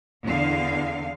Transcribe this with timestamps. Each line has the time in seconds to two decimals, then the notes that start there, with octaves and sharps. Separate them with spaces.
0.25 E2 D3 F5